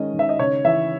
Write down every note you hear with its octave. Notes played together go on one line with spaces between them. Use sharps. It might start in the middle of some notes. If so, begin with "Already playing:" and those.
Already playing: D#3 G#3 C#4 D#5
D#3
E5
D#5
C#3 C#5
E3 E5